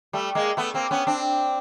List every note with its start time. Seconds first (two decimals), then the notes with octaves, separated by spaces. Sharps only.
0.13 G3 A3
0.35 G#3 A#3
0.57 A3 B3
0.74 A#3 C4
0.91 B3 C#4
1.07 C4 D4